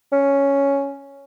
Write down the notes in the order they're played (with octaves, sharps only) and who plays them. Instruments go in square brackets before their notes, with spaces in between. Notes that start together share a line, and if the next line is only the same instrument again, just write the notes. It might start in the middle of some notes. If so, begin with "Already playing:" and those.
[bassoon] C#4